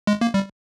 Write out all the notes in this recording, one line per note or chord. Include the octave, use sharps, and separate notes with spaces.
G#3
A#3
G3